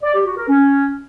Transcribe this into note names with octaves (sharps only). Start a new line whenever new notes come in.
D5
G4
F#4
A#4
C#4